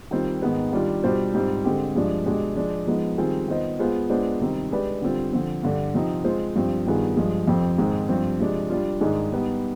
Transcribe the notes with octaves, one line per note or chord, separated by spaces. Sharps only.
D#3 G3 C4 F4
G#2 D#3 G#3 B3
D#3 G3 D4 F4
B2 G3 D4 F4 C5
G#2 G3 C4 F4
D3 G#3 C4 G4
G2 F3 G#3 D4
B2 G#3 D4 G4
F3 G#3 D4
F3 G#3 B3 D#4
D#3 G3 C4 F4 G#4
D#3 B3 F4 C5 D#5
G#3 B3 F4 G#4 C5
G#3 B3 D4 F4 C5
C3 D#3 G3 C4 D#4
G#3 D4 G4 B4 D5
D3 G3 C4 F4
D3 F3 C4
G2 D3 G3 D4
C3 F3 C4 D#4
G#3 C4 F4 C5
G2 F3 C4
G2 D#3 B3 F4 G#4
G2 F3 G#3
F2 C3 F3 C4 G4
G#2 D#3 G#3 C4
G2 F3 C4 G4
C3 F3 G#3 D4
G3 D4 F4
G#2 D#3 G#3 D4 G#4
G3 B3 D#4